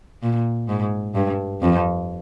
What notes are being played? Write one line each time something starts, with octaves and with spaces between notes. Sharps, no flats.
A#2
G#2
G2
F2